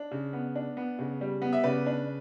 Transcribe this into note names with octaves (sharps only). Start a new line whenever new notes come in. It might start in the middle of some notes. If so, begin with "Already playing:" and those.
Already playing: D4
C#3
B3
D4
B3
C#3
G3
B3
E5
C#3 B4 D5
D4